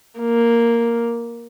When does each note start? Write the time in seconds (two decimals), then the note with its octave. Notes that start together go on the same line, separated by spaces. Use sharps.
0.20 A#3